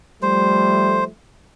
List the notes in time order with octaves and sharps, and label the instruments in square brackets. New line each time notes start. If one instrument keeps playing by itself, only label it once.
[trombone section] F3 G3 A3 [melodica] C5